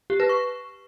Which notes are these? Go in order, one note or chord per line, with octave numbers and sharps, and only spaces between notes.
G4
B4
C#6